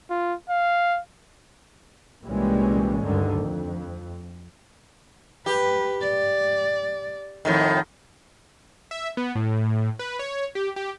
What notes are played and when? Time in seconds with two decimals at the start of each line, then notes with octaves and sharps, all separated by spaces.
0.10 F4
0.50 F5
2.23 C2 A#2 E3 G3 G#3 C#4
3.03 D2 G2 D3 D#3
3.40 F2
5.46 G4 B4
6.01 D5
7.45 F2 A2 D#3
8.91 E5
9.17 B3
9.35 A2
9.99 B4
10.19 C#5
10.55 G4
10.76 G4